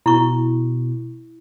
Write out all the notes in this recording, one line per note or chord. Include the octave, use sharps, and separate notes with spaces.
B2 E4 C#6